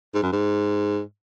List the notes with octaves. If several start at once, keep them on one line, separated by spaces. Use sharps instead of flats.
G#2
F#2
G#2